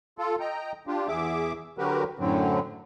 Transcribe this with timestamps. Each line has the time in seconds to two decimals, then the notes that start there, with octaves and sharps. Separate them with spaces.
0.18 F4 A4
0.40 D#5 G5 A#5
0.87 D4 F4 G4
1.08 E2 G#4 E5 D6
1.78 D3 F#3 F#4 G4 A#4 B4
2.19 F#2 A2 D3 F#3 C4